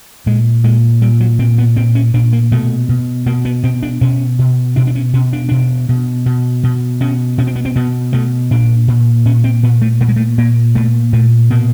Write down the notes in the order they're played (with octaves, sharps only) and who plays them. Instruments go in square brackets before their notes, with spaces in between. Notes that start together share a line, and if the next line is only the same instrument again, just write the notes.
[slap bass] A#2 G#3
A#2 G#3
A#2 G3
F#3
A#2 C4
B3
A#2 C4
C#4
A#2 D4
A#3
B2 A3
B2
B2 A#3
B3
B2 C4
D4
B2 C#4
B2
B2 D4
D4
C#4
B2 C#4
D4
B2 D4
B2
B2
B2
B2 C#4
B2 C#4
C4
B3
C4
B2 B3
B2 A3
A#2 D4
A#2
A#2 C#4
C4
A#2 B3
A3
A#2 A3
G#3
A3
A#2 A#3
A#2 A3
A#2 A3
B2 A#3